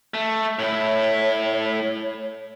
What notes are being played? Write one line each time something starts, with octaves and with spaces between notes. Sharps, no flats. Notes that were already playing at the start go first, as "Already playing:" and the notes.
A3
A2 E4 C#5